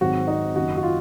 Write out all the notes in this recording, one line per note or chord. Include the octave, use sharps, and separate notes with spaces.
G#1 G#2 D#3 F#3 C4 F#4
D#4
F#1 F#2 D#3 F#4
F#4
F4